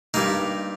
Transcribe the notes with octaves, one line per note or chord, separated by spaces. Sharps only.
G2 G3 A#3 D#4